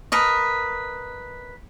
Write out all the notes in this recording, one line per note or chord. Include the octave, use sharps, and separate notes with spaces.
A#4 B4 D#5